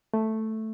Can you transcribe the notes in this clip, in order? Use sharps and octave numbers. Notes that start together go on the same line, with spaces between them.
A3